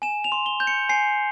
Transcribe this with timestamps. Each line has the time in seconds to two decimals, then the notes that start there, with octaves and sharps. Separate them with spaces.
0.02 G#5 E7
0.24 F7
0.32 C6
0.46 G7
0.60 G6
0.67 C#7
0.89 G#5 C7